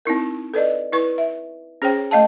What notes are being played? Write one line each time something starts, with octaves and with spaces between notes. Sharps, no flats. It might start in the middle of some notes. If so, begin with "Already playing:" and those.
C4 D#4 E4 A#4
A4 B4 D5 D#5
E4 B4 C#6
E5
C#4 G#4 C5 C#5 G5
A3 D#5 F5 A5